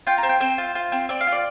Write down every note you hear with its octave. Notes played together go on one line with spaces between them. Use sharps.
F4 G5
A#5
C4
G5
C4 C5
F4
F4
C4
C4 D5
F5
F4
D5